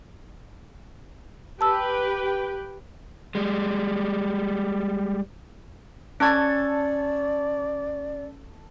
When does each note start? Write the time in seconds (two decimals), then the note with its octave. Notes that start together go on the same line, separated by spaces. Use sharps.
1.61 G4 B4 G5 A5 E6
3.35 G3 G#3
6.20 C#4 A4 D5 A5 C#6 G#6